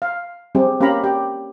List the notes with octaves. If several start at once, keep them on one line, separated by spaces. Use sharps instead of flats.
F5
G3 C4 G4 G#4
A#3 C#4 G4 F5 A#5 B5
G4 D5 G5